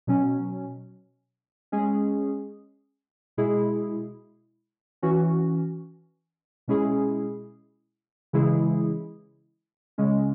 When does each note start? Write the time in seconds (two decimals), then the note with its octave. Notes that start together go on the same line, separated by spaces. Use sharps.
0.07 B2 F#3 C#4
1.72 G#3 C#4 G#4
3.37 B2 G#3 E4 G#4
5.02 E3 C#4 F#4
6.68 B2 G#3 C#4 E4 G#4
8.33 C#3 E3 G#3 E4 G#4
9.98 C#3 G#3 C#4